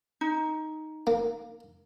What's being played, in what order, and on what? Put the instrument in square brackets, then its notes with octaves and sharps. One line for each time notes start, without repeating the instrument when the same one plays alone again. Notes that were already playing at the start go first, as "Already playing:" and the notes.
[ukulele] D#4
[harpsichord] A#3